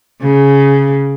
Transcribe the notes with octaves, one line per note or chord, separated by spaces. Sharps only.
C#3